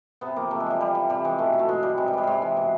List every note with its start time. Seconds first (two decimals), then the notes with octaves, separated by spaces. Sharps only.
0.21 C3 B3
0.36 F3 A#3
0.51 C3 A3
0.60 G#3
0.66 F3 G3
0.80 C3 G3
0.95 E3 G3
1.10 C3 G3
1.25 E3 G#3
1.39 B2 A3
1.53 F#3
1.59 A3
1.69 B2 G#3
1.83 F#3 G3
1.97 C3 G#3
2.08 G3
2.13 E3 G#3
2.23 C3 G3 G#3
2.42 E3
2.57 B2